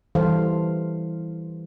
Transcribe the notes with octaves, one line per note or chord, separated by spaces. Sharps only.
E3 G3 A4 C5 F5